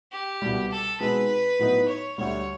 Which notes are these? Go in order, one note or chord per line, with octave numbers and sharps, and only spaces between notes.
G4
C2 B2 G3
A4
B2 G#3 C4 D#4 B4
A2 F#3 B3 D#4
C#5
D2 D3 G3 C#5